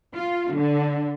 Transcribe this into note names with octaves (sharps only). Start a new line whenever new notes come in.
F4
D3